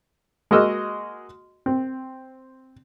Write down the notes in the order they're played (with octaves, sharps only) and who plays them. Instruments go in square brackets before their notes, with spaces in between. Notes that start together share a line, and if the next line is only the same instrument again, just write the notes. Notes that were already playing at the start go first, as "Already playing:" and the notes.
[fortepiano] G#3 A#3 F#4 D#5 E6 F6
C4